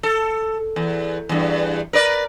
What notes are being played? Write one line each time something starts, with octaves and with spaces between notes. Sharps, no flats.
A4
E2
E2 G2
A#4 B4 D5